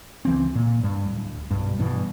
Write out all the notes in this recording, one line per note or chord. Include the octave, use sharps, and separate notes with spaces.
C#2 E3 C4
A#2
G2
D1
B1 G2
G2 B2 E3